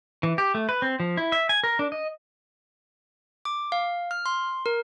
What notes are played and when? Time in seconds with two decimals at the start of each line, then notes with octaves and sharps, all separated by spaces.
0.23 E3
0.38 G4
0.55 A3
0.69 B4
0.82 C4
1.00 F3
1.17 E4
1.32 E5
1.49 G#5
1.64 A#4
1.79 D4
1.92 D#5
3.45 D6
3.72 F5
4.11 F6
4.26 C6
4.66 A#4